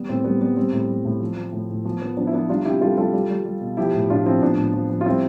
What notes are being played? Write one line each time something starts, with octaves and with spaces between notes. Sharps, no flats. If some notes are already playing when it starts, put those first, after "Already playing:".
Already playing: G3 B3
A2 C4
G3 B3
G3 B3
G3 C4
A2
G3
A2
F3
F3
A2
A2
F3 B3
F3 B3
F3 B3 D4
E4
F3 B3 D4
G3 D4 F4
C3 E4 G4
G3 F4 A4
G3 F4 A4
G3
G3
G3
B2
F3 E4 G4
A2
A2 D4 F4
F3 C4 E4
A2 B3 D4
A2
F3
F3
F4
G3 C4 E4